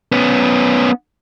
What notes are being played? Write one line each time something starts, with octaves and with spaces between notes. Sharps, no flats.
B3 C#4